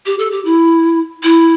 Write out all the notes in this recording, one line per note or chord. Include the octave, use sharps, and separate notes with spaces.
G4
A4
G4
E4
E4